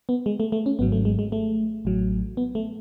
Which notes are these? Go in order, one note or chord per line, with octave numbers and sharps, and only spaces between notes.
B3
G#3
A3
A3
C#4
G#1 G#2 F#3 B3
A3
G#3
G#3
A3
A1 A2 F#3
B3
A3